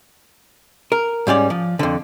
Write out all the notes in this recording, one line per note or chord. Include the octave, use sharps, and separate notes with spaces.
A#4
G#2 G3 C#4 D5
F3
F2 D3